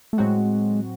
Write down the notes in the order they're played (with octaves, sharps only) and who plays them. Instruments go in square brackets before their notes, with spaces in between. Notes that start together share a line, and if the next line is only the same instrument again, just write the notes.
[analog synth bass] A3
[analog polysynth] A2 F#3 C4 F#4 [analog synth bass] G#3